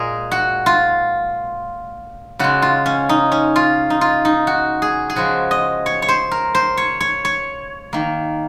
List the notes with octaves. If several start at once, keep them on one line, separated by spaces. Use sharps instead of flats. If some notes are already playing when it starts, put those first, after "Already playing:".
Already playing: A#2 G#3 G#4 A#4
F#4
F4
C#3 G#3 F#4
F4
C#4
D#4
C#4
F4
D#4
F4
D#4
F#4
G#4
G#4
C#3 F3 G#3 F#4
D#5
C#5
C#5
C5
A#4
C5
C#5
C#5
C#5
D#3 A#3